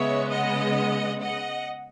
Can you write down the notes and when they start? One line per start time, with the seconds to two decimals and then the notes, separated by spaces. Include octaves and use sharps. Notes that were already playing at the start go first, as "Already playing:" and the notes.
Already playing: C#3 G#3 B3 C#5 E5
0.31 D#5 F#5
1.22 D#5 F#5